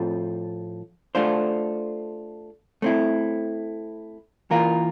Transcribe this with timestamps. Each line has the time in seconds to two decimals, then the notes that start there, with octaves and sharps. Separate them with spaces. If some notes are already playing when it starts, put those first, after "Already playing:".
Already playing: A2 F3 C4 F4 A4
1.15 A3 D4 F4 C5
2.82 A3 C4 E4
4.51 E3 A#3 F4 A#4